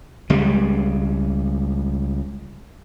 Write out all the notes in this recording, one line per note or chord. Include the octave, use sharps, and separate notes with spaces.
C#2 G3 G#3